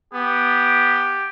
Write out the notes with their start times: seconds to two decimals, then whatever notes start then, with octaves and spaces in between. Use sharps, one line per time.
0.14 B3 G4